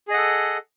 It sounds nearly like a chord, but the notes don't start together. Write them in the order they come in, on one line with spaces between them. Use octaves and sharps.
G#4 D#5 F#5 A4